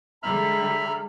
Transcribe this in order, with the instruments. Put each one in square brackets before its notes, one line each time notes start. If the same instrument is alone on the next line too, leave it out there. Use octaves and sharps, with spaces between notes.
[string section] D3 G3 G#3 [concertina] E5 B5 F6 [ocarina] A#5